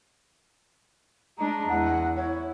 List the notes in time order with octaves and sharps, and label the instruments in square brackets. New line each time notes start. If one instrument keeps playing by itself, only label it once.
[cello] G#3 D4 [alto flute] A#5
[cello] E2 [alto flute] F#5
[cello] E4 [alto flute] C#5